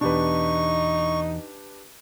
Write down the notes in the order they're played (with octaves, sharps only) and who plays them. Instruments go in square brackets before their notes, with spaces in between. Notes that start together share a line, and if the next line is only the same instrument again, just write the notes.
[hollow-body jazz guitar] E2 B2 [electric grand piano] D4 G4 B4 [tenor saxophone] D#4 [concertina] C#6